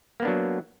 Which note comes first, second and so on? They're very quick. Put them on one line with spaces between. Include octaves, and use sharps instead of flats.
A#3 B3 D4 F#3